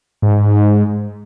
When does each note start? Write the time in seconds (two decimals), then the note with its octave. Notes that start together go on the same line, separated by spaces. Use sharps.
0.22 G#2